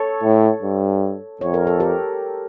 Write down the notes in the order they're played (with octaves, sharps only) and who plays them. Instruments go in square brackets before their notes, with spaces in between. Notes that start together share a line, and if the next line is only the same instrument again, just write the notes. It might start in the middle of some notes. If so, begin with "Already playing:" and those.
Already playing: [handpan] A4 C#5
[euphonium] A2
G2
[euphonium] F2 [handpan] C#5
[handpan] A#4
A4
G4 A#4